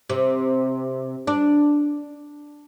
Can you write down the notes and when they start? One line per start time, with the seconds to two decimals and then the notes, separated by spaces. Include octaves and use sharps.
0.10 C3
1.27 D4